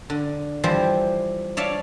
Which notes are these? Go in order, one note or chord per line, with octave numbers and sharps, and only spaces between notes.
D3
E3 F3 G3 E4 C5
C#5 D5 E5 F5 A5